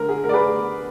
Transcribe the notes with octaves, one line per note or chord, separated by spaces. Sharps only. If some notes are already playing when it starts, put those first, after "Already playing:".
Already playing: D3 A#4
G#4
A#4
D5
G#4 B4